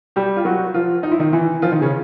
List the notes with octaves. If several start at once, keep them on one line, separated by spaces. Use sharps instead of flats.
G3 G4
F4
F#3 F#4
F3 F4
D#4
E4
D#3 D#4
E3 E4
F3 F4
D#3 D#4
C#3 C#4